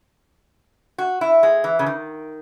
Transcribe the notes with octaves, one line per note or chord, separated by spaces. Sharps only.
F#4
E4
G#3
E3
C#3
D#3